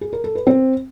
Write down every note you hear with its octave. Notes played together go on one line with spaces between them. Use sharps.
G#4
A#4
A4
B4
C4